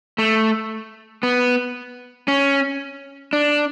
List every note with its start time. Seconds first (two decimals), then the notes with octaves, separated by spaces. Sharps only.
0.18 A3
1.23 B3
2.28 C#4
3.33 D4